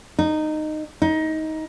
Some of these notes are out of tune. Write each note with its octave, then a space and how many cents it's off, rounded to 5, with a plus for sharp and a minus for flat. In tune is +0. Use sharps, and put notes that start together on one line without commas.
D#4 -15
D#4 +20